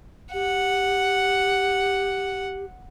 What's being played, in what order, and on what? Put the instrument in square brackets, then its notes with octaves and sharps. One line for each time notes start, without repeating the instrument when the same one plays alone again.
[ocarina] G4 [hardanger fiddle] F#5